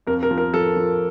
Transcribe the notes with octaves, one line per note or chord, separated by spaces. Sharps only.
F2 A#4
A#4
F3
A#4
F3 A4
F3